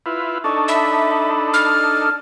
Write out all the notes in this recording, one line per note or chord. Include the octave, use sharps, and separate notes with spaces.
E4 F4 B4
D4 D#4 A4 C#6
E5 B5
F6